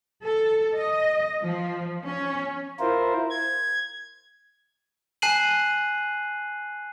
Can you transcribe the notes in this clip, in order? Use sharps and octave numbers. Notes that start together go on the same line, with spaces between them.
A4
D#5
F3
C#4
E4 F4 A#4 C5
G#6
G#5 A5 F#6 C7 D#7 F#7